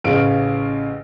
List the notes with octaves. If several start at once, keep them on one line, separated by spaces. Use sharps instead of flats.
A1 C#3 F5 D7